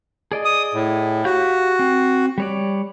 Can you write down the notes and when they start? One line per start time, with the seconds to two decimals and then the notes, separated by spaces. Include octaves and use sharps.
0.32 G#4 D5 D#5
0.45 D#6
0.74 A2
1.25 F#4 G4 F5 G6
1.79 C4
2.38 G3 C#5 D5